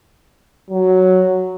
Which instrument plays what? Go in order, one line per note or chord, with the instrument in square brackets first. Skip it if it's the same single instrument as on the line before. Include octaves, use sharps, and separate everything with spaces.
[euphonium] F#3